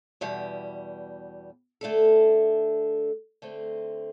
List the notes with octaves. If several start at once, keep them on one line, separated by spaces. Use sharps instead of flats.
E2 B2 G3
D3 A3 D4 A4
D3 A3 C4